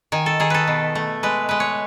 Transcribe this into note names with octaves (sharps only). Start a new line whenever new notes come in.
D#3 G#5
A4
D#3 G#4
A4 B4
B2
A3
G#3 B4
G#3 B4
C#5